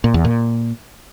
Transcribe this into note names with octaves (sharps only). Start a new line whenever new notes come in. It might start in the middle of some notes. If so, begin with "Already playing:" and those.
A#2
E2
A#2